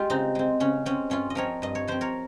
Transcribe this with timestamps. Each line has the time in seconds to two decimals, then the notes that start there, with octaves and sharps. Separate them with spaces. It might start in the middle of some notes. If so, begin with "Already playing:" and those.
Already playing: G#3 F4 G4
0.10 C#3 C4 D#4
0.35 G#3 C4
0.60 C#3 C#4
0.86 G#3 C4 C#4
1.10 G2 C#4 F4
1.30 D#5
1.35 F3 C4 A#4 C#5
1.62 G2 D#5
1.75 C#5
1.88 F3 C4 C5
2.01 A#4 C#5